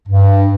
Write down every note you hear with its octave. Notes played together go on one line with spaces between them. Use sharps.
G2